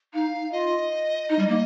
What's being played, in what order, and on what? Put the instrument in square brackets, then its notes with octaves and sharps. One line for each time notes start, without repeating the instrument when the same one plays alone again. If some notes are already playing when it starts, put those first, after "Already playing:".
[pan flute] D#4 [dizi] F5
[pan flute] F4 [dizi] D#5
[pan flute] D#4
G3
A#3